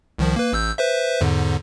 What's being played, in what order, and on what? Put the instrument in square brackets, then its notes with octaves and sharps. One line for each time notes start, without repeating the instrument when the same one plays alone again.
[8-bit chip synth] C2 D#3 F3
A#3 B4
A1 E6 G6
B4 C5 E5
E2 G#2 D3